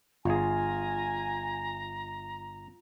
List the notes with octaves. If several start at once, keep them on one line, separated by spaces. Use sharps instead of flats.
G1 F4 G#4 G#5 A#5